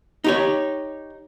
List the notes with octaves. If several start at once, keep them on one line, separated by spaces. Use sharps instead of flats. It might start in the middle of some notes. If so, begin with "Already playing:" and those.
D#4 G4 C#5